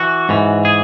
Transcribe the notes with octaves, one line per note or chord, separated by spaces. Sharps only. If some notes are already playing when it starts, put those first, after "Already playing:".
Already playing: E3 F#4
G#2 E3
G#4